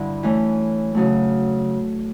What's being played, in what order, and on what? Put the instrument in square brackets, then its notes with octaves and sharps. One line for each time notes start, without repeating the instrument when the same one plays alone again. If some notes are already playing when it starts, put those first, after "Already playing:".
Already playing: [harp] G2 D3 E4
E3 A3 C#4
C#3 F#3 A3